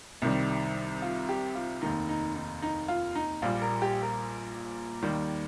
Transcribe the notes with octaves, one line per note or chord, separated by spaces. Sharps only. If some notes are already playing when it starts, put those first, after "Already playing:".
C2 C3 D#3 G3
F4
G4
F4
F1 D#2 D#3 D#4
D#4
D#4
D#4
F4
D#4
A#1 A#2 G3 F4
A#4
G4
A#4
D#2 D#3 G3